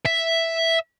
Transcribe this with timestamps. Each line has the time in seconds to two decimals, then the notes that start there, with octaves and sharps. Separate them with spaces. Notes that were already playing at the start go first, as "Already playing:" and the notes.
0.06 E5